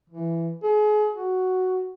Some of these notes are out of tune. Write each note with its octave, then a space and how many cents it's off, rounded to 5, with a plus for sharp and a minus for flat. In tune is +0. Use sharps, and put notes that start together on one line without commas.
E3 +15
G#4 +35
F#4 +5